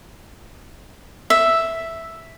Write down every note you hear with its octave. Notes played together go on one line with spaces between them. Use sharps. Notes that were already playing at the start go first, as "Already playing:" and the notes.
E5